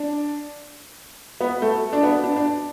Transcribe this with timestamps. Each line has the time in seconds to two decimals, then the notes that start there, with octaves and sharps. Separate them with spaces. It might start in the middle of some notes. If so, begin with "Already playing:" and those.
Already playing: D4
1.41 B3
1.62 A3
1.93 D4
2.03 B3
2.24 D4
2.36 D4